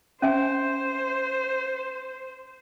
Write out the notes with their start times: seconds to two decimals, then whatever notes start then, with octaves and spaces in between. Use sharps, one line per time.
0.22 C#4 C5 E5 G#5